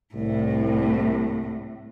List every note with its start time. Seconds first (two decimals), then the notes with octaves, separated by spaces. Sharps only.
0.14 C2 A2